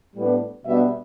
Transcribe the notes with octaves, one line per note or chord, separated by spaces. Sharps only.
A2 G3 B3 D4
B2 G3 B3 D4 E5